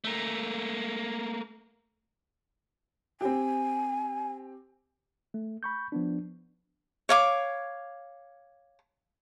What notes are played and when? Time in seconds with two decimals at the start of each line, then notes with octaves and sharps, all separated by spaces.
0.04 A3 A#3
3.21 C4 G4 G#5
5.34 A3
5.63 B5 C#6 G6
5.92 F3 B3 D4
7.09 C#5 F5 D6